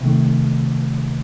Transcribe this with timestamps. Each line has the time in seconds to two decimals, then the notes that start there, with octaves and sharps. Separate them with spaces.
0.01 C3 D#3 A3